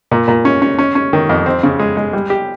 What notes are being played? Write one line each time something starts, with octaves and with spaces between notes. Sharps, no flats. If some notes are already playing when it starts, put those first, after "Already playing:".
A#2
A#2
C#4
C#4
C#4
C#4
D#3
F2
C4
C#3
G#3
G#3
G3
G4